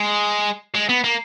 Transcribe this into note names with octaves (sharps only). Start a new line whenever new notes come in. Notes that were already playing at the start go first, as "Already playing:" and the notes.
Already playing: G#3
G#3
B3
A#3